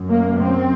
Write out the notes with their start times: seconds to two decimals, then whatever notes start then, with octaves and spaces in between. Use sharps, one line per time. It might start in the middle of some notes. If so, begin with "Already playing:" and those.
Already playing: F#2
0.09 A#3
0.40 C4